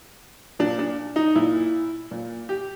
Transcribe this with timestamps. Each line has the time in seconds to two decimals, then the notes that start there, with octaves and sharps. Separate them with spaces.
0.59 A#2 D4
0.79 D4
1.16 D#4
1.35 A#2 E4
2.11 A#2
2.49 G4